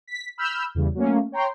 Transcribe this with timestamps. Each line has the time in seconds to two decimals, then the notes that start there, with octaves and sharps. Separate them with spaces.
0.07 B6
0.38 B5 E6 F6 G6
0.75 E2 C#3 G3
0.95 F#3 A3 A#3 C#4
1.32 C#5 G5 A#5 C6